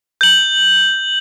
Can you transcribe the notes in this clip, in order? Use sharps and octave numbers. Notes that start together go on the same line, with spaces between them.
G6 F#7